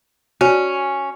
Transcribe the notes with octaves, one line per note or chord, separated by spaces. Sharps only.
C#4 F#4